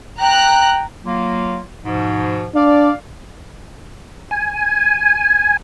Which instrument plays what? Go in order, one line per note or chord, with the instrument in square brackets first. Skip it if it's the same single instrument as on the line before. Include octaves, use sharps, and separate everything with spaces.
[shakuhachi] G5 [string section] A#5 F#6
[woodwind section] F#3 A#3 F4
G#2 B2 F3
[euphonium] D4 [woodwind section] D5 F5
[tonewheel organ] G#5